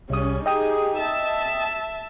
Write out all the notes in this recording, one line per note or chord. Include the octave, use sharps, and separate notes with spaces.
C2 G3 C#4 G#4 D#6
D#4 G4 G#4 D#5 G5 D#6
E5 A5